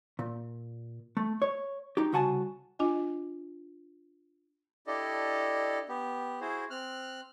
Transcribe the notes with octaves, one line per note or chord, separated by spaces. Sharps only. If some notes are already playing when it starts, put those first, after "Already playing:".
A#2
A3
C#5
D#4 G4
C2 C#3 F#4 F#5 G#5 A5
D4 F4 D#5 G#5
D4 E4 G4 A4 D5 D#5
B3 G4
E4 F#4 G#4 C5
C4 F6 F#6